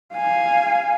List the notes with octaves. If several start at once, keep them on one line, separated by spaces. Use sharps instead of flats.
F5 G#5